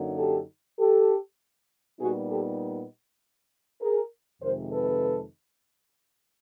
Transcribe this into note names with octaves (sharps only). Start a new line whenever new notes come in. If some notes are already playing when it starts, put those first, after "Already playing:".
Already playing: F#2 D3 F#3 A#3 D#4
G4 A4
G4 A4
A#2 G3 B3 D#4 F#4 G#4
G4 A4
G#4 A#4
F2 C3 D#3 G#3 A#4 C5
A4 B4